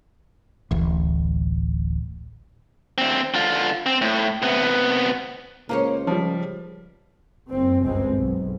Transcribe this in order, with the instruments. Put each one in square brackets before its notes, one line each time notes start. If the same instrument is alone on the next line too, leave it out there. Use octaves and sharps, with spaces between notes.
[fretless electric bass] D1 A1
[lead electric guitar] D2 C4
D3 F4
C4
A2
C3 B3
[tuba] C#2 [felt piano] A#3 [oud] C#4 C5 C#5
[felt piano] F3 G3
[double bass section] F#1 C4
G1 C#2 G#3 C4
B1